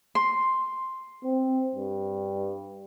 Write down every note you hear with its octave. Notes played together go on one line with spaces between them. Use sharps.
C6
C4
G2